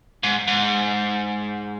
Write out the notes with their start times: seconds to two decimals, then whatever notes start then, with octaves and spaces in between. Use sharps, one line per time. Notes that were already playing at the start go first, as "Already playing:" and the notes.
0.23 G#2
0.47 G#2